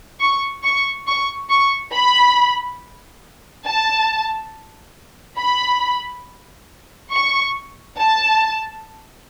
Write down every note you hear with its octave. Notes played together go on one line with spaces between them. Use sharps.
C#6
C#6
C#6
C#6
B5
A5
B5
C#6
A5